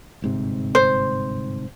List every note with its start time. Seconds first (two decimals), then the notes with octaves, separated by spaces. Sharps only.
0.22 G1 G#2 C3
0.75 C5